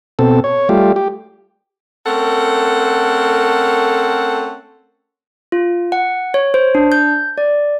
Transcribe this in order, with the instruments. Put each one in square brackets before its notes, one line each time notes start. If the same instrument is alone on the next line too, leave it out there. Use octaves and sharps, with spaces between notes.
[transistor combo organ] B2 C4 A4
C#5
G3 A3 F4 G4
G4
[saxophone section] A3 C4 C#4 A4 A#4 F#5
[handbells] F4
F#5
C#5
C5
D4
G6
D5